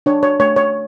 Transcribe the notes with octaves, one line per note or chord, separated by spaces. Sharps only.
D4 C#5
C#5
A3 C#5
C#5